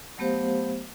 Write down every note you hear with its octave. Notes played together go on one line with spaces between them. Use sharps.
F#3 A3 B3 G4 C5 F5